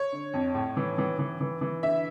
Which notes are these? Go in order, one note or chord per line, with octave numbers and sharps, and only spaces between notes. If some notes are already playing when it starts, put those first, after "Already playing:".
Already playing: C#5
D3
F2
A2
E3
E3
E3
E3
E3
D3 E5